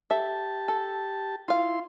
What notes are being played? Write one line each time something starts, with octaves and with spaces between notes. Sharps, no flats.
G4 A4 E5 A5
A4
E4 F4 F5 C6